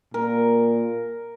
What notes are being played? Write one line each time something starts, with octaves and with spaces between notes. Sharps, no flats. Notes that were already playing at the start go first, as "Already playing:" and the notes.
A#2 A#4